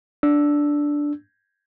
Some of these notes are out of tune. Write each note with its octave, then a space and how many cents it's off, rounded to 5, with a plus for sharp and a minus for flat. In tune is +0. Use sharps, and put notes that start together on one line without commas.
D4 -5 E6 +0